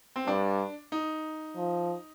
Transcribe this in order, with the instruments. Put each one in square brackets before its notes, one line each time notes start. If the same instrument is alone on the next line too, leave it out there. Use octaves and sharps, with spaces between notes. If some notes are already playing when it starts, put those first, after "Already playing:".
[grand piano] C4
[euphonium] G2 [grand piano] D4
[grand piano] D#4
[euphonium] F3